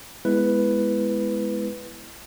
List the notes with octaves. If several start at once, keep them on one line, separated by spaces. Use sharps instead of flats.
G#3 B3 E4 B4